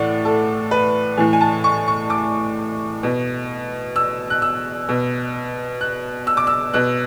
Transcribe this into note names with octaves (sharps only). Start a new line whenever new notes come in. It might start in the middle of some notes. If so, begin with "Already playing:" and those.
Already playing: A2 E3 D5 F#5
A4
B4
A2 E3 G#5
G#5
A5
C#6
C#6
D6
B2
E6
F#6
E6
B2
F#6
E6
D6
E6
B2 F#6